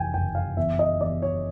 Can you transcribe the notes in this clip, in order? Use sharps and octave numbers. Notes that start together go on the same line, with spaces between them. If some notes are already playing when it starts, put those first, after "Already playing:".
Already playing: F1 E3 G5 G#5
F#1 G5
F5
E2 E5
D#5
E2 D5
C#5